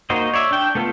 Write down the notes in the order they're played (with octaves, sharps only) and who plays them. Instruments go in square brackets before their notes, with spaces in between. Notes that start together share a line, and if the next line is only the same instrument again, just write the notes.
[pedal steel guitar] A#3 D#4 F#4 C5 D#5
C#5 D5 E5
D4 G5
A3 B3 F4 A4